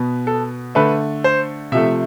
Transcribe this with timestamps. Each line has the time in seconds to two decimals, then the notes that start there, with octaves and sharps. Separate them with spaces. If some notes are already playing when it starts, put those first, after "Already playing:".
Already playing: B2 B3
0.27 A4
0.75 D3 A3 B4
1.24 C5
1.72 C3 F3 A3 E5